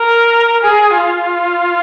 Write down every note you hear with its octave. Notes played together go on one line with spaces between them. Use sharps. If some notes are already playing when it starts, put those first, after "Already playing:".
Already playing: A#4
G#4
F4